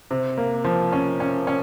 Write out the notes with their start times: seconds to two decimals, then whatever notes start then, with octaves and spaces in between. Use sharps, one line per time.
0.11 C3
0.37 A#3
0.64 F3
0.92 C#4
1.20 C#4
1.47 C#4